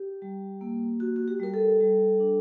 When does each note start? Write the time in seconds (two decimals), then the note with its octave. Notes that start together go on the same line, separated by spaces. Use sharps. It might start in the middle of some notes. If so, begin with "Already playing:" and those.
Already playing: G4
0.22 G3
0.61 A#3
1.00 F#4
1.16 F#4
1.28 G4
1.40 G3 A#4
1.54 A4
1.80 G3
2.20 D4